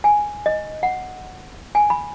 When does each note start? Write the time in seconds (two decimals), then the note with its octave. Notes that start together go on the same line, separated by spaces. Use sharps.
0.04 G#5
0.46 D#5
0.83 F#5
1.75 G#5
1.90 B5